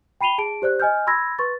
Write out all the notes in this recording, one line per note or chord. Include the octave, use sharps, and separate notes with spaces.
G5 B5 C7 D#7 F7 G7
G#4 A5 D7
G4 C5 D5 F#6
D#5 G#5 F6 G6
B5 C6 E6 G#6 A#6
B4 C6 C#6 A6